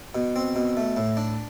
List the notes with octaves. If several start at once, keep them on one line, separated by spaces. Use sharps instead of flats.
B2
C4
B2
A3
A2
D4